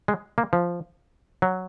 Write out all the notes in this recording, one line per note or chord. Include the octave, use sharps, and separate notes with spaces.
G#3
A#3
F3
F#3